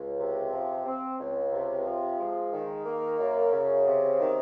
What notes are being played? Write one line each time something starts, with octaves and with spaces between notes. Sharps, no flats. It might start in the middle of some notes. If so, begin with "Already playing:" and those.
Already playing: C#2
C3
F3
C4
C#2
C3
F3
G#3
D#3
A#3
F#2
C#3
C3
D#3